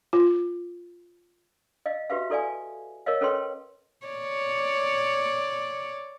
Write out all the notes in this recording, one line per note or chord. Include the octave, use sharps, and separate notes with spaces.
F4
D#5 F5
F#4 G4 B4 E5 F5
E4 A4 D5 F5 G#5
A#4 C#5 D#5 F5
C#4 A4 B4 C#5 G5 C6
C#5 D5